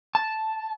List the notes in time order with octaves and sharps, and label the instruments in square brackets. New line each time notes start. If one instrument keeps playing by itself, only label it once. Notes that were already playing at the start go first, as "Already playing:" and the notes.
[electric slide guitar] A5